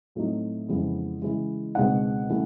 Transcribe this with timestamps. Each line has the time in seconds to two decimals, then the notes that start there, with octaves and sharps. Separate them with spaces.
0.15 A2 F#3 A3 C4 D#4
0.69 F2 C#3 E3 G#3 B3
1.22 C#3 E3 G#3
1.75 C#2 B2 G#3 C4 D#4 F#5
2.30 C#3 E3 A3